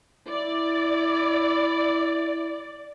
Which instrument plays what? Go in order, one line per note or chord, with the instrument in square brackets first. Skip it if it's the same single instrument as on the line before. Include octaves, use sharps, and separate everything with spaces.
[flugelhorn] E4 [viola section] D5